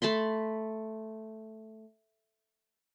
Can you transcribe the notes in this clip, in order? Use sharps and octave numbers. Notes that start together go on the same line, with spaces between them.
A3 A5 B5 C6